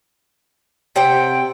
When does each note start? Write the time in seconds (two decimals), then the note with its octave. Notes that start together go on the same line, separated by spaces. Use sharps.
0.96 C3 C4 F#5 G5